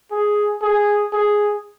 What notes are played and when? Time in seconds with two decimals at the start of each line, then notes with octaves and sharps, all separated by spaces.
0.11 G#4
0.61 G#4
1.13 G#4